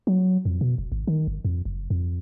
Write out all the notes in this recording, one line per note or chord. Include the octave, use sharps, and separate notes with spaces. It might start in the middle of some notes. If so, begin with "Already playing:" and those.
F#3
F2
B2
F1
G#1
D#3
G1
F2
F#1
F2